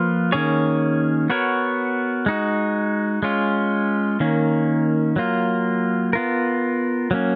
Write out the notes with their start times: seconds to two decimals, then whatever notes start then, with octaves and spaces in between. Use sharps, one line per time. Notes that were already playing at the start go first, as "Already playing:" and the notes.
Already playing: F3 A#3 F4 B4
0.32 D#3 A#3 C#4 G#4 C#5
1.30 B3 F#4 A#4 C#5
2.26 G#3 D#4 F#4
3.23 G#3 C#4 F4
4.20 D#3 A#3 C#4
5.16 F#3 A#3 F4
6.13 B3 F4 A#4
7.11 F#3 A#3 C#4